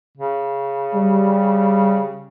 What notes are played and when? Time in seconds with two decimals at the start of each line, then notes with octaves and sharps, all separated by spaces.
0.17 C#3
0.94 G3